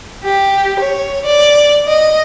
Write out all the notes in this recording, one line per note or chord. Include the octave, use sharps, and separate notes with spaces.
G4
C#5
D5
D#5